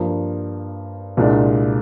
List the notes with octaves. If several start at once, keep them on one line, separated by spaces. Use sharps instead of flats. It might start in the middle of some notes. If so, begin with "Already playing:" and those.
Already playing: G2 F3 A#3
C2 A#2 G#3 D4